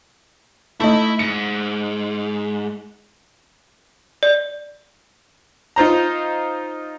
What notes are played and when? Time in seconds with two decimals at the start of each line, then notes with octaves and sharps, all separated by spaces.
0.80 A3 D#4 E4
1.19 G#2 C#7
4.23 D5
5.76 D#4 F4 C5 A#5